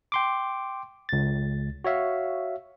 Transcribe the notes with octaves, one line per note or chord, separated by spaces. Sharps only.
G5 C6 D6
C#2 A6
F#4 C#5 E5 F5